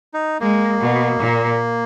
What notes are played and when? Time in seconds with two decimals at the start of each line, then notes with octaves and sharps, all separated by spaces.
0.14 D#4
0.40 G#3 A#3
0.80 B2
1.20 A#2